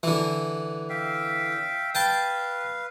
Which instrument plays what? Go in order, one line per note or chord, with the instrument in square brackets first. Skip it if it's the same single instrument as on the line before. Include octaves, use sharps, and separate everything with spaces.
[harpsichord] D3 E3
[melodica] E5 F5 G5
[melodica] B4 F5 [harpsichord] G5 A5